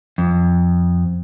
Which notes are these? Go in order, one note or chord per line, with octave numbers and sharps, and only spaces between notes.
F2